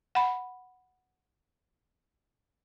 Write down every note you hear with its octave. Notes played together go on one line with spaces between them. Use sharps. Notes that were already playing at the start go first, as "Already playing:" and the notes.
F#5 B5